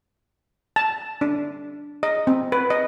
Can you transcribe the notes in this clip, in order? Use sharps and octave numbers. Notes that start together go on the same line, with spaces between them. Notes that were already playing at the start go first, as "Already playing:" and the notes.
A5
D4
D#5
C4
B4
D#5